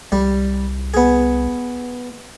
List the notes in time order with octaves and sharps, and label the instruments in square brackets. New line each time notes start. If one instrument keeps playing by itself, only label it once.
[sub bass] C2 [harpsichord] G3
[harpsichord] B3 G#4